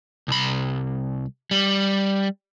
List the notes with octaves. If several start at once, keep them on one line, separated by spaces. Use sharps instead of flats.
C2 B5
G3